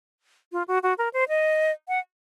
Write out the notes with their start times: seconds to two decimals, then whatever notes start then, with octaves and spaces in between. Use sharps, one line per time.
0.52 F4
0.68 F#4
0.83 F#4
0.98 A#4
1.13 C5
1.29 D#5
1.88 F#5